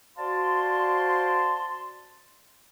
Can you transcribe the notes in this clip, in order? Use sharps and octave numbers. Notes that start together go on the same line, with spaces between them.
F#4 C5 D5 F5 A5 C6